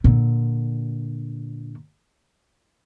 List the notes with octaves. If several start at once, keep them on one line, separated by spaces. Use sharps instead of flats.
A#2 D3